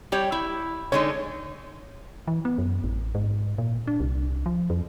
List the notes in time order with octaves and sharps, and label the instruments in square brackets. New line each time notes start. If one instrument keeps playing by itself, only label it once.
[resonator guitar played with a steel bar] G3 G4 C#5
E4
[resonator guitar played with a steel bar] D3 G#3 D#4 [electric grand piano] C#5
[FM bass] E3
B3
F#2
A1
G#2
A#2
D4
C2
F3
F2